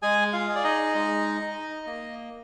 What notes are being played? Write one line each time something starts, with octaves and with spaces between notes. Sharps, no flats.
G#3 G#4 G#5
F4 F5
G#4
D5
D#4 D#5
G#3
D#4
A#3